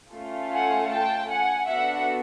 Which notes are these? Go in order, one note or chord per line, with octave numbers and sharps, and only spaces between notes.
A3 C#4 F4 A4
F#5 G#5
G5 A5
F#5 G#5
B3 D4 F#4 A4 E5 F#5